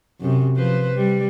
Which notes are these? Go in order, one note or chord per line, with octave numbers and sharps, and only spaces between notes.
F#2 C3
F3 B4 C5
G3